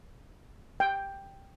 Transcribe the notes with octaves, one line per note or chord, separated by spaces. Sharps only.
G5